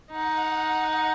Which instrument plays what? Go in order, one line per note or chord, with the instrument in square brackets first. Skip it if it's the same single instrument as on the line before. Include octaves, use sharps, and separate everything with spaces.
[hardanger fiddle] D#4 [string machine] F#5